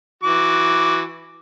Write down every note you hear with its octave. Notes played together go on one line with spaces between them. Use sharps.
E3 F#4 D6